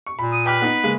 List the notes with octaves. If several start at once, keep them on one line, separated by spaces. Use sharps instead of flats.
C#6
A#2 B5
D#6
B4 G5 D6 F6
B3 D#4
C#3 G#3 A#3